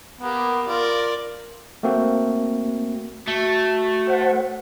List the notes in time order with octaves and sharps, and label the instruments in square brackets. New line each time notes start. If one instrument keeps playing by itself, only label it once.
[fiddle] A#3 G4 [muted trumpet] B3
[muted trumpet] F4 [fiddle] A#4 D5
[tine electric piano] A3 A#3 C4 F#4
[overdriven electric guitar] A3 [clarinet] F#4
[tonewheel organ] C5 F#5